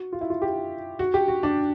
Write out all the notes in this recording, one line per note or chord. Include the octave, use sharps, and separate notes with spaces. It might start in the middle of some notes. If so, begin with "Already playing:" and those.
Already playing: F#4
F4
E4
F4
G4
F#4
G4
F#4
D4